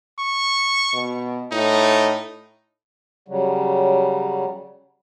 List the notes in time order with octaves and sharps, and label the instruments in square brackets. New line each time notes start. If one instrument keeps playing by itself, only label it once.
[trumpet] C#6
[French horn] B2
[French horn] A2 [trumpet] D#4
[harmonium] C#3 F#3 G3